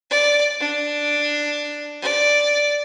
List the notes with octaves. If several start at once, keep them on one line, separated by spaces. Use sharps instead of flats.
D5
D4
D5